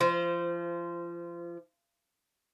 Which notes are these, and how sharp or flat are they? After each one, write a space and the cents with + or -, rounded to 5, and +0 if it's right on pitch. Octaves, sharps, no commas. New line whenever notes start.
F3 -30 C5 -15